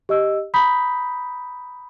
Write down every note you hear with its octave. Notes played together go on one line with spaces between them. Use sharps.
G4 D#5 E6
A#5 B5 D#6 G6 B6